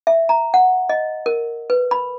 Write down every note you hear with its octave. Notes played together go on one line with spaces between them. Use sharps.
E5
A#5
F#5
D#5
A#4
B4
B5